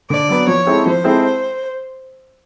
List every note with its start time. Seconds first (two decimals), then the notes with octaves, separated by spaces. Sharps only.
0.10 D3 D5
0.29 F#3 B3
0.47 F3 C#5
0.66 G#3 C4 E4 A4
0.85 F3 C5
1.04 G#3 C4 E4 A4